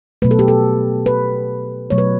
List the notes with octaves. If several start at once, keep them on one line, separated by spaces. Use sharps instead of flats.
B2 F#3 A3 B4
A4
G4
A4
B4
B2 F#3 A3 C#5
B4